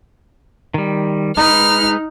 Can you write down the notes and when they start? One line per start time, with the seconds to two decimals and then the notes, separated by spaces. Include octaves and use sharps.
0.74 D#3 G3
1.37 G#3 D#4 B4 F6